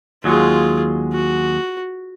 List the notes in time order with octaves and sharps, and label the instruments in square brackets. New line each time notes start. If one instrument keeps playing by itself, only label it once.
[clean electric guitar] D#2 F#3 G#3 [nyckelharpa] F4 G#4
[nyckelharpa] F#4